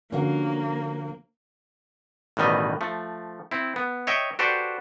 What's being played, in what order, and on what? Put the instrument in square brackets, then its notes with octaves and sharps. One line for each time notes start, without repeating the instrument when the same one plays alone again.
[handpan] D3 F3 A#4 [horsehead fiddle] A#3 [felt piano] C#4 F#4 F5
[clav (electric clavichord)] A1 B2 D#3 G3 D#5
F3 A3
C4 E4
B3
C#5 D#5 E5 G5
F#4 G4 A4 B4 C5 D5